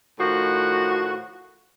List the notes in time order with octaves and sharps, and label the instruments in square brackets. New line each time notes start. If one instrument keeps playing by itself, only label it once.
[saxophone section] A2 D#3 F3 F#4